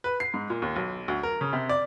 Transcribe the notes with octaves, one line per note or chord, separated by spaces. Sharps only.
B4
C7
G#2
A#2
D#2
B1
D2
A#4
C#3
C3
D5